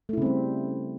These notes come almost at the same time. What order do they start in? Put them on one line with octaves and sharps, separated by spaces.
A3 E4 C#3 C4 G3